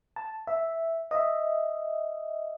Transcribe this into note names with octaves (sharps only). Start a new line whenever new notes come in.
A5
E5
D#5 E5